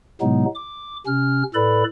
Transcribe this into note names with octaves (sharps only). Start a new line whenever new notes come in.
A2 C3 F#3 G#3 B3 D#4
D6
C3 C#4 F6
A2 A4 B4 D5 B5